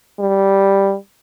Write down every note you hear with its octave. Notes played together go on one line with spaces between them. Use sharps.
G3